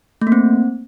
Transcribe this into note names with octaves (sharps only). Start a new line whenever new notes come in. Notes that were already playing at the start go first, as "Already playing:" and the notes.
A3
A#3
C4